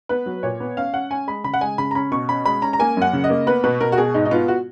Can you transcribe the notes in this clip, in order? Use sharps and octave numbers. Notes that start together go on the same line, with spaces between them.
B3 B4
F#3
A#2 C#5
B3
C#4 F5
C#4 F#5
C#4 G#5
G#3 B5
C#3 B5
F#5
G#3 G#5
C#3 B5
A#5
C#4 B5
B2 C#6
C#4 B5
G#3 B5
C#4 A#5
A#5
A#3 G#5
F#2 F#5
C#3
D#5
A#3
B3 B4
B2 B4
B2 A#4
F#4
B2 G#4
G#2 D#4
D#4
B3 F4
F#4